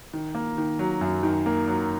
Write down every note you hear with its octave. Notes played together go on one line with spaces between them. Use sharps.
D#3
A#3
D#3
F#3
F#2
D#3
A#3
F#3